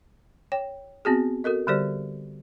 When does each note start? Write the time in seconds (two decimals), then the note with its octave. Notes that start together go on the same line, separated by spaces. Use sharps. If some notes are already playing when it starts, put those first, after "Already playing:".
0.52 C#5 G5
1.05 B3 C4 F#4 G#4
1.44 F#4 A4 A#4 D#5
1.67 D3 G3 G4 C5 D5